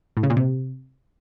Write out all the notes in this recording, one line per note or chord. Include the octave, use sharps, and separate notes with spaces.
A2
C#3
A#2
C3